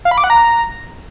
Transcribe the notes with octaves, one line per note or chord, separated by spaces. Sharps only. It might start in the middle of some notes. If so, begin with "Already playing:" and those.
F5
B5
D6
F#5
A#5